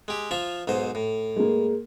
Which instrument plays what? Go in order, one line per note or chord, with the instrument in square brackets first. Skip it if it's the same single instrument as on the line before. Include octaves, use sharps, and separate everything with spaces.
[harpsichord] G#3 G4
F3 F4 E5
B1 G#2 C5
A2
[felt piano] G#3 A#3